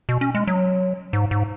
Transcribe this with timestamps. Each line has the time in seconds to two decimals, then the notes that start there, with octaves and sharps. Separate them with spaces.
0.09 B2
0.21 C#4
0.35 G#3
0.47 F#3
1.13 G#2
1.31 G#2